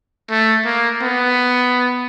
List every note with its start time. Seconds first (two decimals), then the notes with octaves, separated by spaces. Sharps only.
0.30 A3
0.65 A#3
1.02 B3